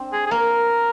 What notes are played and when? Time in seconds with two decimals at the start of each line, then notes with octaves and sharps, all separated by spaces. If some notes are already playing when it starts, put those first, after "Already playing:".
Already playing: C4 D4
0.12 G#4
0.26 G#4
0.31 A#3 A#4